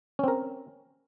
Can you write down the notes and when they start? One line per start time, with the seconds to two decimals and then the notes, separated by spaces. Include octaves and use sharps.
0.19 C#4
0.24 C4
0.28 A#4